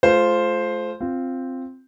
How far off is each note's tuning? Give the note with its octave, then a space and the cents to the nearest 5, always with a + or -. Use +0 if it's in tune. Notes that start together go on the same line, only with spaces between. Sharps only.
A3 -35 F4 +0 C5 +0
C4 +0 F4 +0